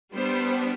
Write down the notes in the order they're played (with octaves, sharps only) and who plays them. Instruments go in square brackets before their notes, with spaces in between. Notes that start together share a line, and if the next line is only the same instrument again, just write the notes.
[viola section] G3 B3 D4 C5